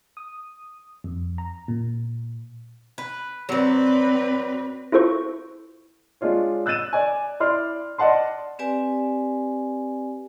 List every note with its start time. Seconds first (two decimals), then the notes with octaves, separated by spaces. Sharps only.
0.17 D#6
1.04 F2
1.38 A#5
1.68 A#2
2.98 B4
3.49 F#3 C4 B4 D5
4.92 E4 F4 A4 C5 C#6
6.21 G#3 D4 F4 C#5
6.66 E6 F#6 G6 A6 D#7 E7
6.93 D5 G#5
7.40 E4 D5 C6 F6
7.98 D5 D#5 F#5 A5 C6
8.59 C4 G4 B4 D5 G#5